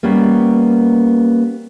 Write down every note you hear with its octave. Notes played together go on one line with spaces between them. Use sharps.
G3 A#3 B3 C#4